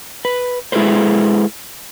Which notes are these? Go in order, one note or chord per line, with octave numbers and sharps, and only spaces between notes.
B4
G#3 E4 G#4 A4 B4 C5